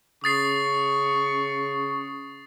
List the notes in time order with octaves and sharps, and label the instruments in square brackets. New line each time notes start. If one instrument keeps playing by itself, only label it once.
[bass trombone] C#3 [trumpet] C#6 [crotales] D#6 A6 C7